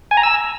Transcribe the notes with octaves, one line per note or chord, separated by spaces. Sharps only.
G#5
A#5
E6